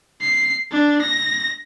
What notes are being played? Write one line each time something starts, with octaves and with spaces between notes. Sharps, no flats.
C7
D4
A#6